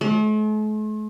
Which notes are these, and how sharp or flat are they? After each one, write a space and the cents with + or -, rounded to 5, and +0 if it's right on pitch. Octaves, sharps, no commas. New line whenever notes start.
A3 -45